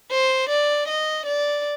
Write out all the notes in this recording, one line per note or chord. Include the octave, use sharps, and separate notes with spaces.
C5
D5
D#5
D5